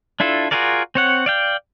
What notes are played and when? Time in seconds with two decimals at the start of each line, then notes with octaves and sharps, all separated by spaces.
0.20 D4 E4 F4 A4
0.51 F4 F#4 G#4 A#4 D5
0.95 C4 C#5 F#5
1.26 D5 F5 G5